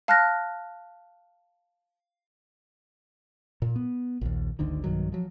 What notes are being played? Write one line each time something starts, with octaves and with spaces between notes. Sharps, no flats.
F5 A5 F6 F#6 G#6 A#6
A#2
B3
A#1 D#2
G#1 D2 D3 D#3
B1 G2 D#3 F#3
F3 F#3